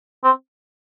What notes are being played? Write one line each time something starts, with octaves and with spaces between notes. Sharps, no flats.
C4